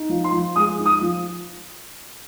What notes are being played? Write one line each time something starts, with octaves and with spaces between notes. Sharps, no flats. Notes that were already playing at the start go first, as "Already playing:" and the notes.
Already playing: D#4
F3
C6
F3
G#3 D#6
D#4
D#6
F3